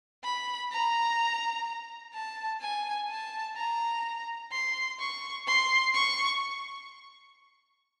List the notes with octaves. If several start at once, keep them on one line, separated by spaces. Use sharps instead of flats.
B5
A#5
A5
G#5
A5
A#5
C6
C#6
C6
C#6